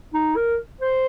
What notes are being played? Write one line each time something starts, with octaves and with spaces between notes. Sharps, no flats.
D#4
A#4
C5